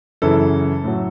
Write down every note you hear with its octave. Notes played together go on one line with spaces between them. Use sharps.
F#2 C#3 E3 A4
A2 F#3